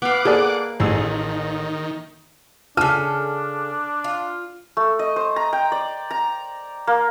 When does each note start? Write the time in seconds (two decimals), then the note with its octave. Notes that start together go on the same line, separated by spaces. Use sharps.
0.02 B3 F5 F#5 D6
0.25 A#3 G#4 A4 D5 D#5
0.80 A1 D#3 G#4 E6
2.77 C#3 D4 A4 A5 F6
4.04 F4
4.77 A3
4.99 D#5
5.16 C5
5.36 A#5
5.53 G5
5.72 D5
6.11 A#5
6.87 A#3